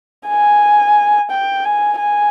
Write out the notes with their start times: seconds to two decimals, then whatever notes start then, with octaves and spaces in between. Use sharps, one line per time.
0.28 G#5
1.31 G5
1.65 G#5
1.99 G#5